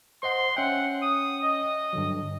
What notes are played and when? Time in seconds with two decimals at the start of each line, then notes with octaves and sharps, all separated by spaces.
0.23 C5 D#5 F#5 C6
0.57 C#4 E5 F#5 G5
1.02 D#6
1.44 D#5
1.93 G2 D3 F#3